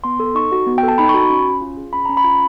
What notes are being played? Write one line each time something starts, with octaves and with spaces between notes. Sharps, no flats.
B3 C6
A4
D#4 C#6
F#4
B3
G5
A4 A5
D#4 B5
C#6
F#4
B5
C#4
C#4
F4
G#4
C#4 B5
C#4 A#5
B5
F4